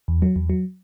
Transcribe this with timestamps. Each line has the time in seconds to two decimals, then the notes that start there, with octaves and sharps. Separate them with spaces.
0.08 E2
0.22 F#3
0.36 E2
0.50 F#3